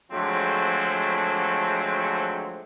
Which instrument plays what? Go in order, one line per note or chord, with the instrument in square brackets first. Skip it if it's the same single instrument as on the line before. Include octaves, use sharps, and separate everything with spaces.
[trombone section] D3 F3 F#3 G#3 A3 C4